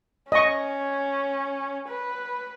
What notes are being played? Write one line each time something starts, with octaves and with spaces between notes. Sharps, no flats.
C#4 D#5 C#6
B4